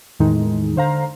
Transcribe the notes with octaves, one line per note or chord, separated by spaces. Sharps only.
E2 A2 D#3 G#3 D#4
D3 C5 F5 A#5